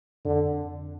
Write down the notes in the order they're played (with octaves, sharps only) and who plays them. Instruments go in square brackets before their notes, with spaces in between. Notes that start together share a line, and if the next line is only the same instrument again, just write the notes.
[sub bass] F2 [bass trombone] D3